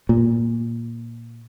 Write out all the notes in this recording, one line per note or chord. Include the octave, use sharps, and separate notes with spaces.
A#2